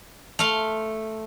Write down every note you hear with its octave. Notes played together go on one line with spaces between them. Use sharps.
A3 F5 C6